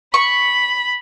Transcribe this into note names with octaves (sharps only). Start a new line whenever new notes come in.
B5 C#6